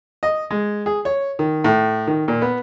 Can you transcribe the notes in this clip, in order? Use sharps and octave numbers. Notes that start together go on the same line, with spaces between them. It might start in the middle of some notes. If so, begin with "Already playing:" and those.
D#5
G#3
G#4
C#5
D#3
A2
D#3
A#2
B3